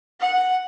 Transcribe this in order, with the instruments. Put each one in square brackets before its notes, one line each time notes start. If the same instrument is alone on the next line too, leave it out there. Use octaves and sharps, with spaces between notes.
[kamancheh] F#5